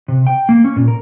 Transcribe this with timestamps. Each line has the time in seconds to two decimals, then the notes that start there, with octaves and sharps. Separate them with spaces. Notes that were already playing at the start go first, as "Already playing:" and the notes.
0.08 C3
0.27 G5
0.49 A#3
0.64 C#4
0.76 A#2
0.88 A#4